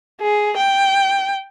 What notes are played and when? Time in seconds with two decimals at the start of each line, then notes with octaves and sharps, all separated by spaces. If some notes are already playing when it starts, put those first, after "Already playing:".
0.21 G#4
0.57 G5